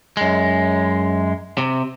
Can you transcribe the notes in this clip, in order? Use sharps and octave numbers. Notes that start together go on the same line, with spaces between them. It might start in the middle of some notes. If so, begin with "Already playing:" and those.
F#2 G#3
C3